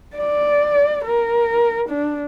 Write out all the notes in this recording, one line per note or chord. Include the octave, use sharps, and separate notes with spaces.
D5
A#4
D4